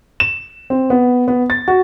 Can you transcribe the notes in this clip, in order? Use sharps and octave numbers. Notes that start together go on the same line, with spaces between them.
E7
C4
B3
B3
A6
F#4